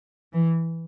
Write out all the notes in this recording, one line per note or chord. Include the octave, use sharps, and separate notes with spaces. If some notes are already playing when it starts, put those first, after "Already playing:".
E3